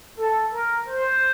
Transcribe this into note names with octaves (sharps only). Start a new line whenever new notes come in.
A4
A#4
C5